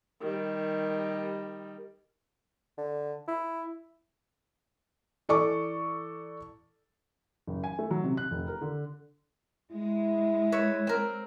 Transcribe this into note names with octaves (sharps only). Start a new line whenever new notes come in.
D#3 G3
D3
E4
E3 A4 D5 C#6 D6
F#1
G#5
A3
F#3
C3
F#6
F1
A#4
D3
G#3 E4
B4 C#5 E5
C4 A#4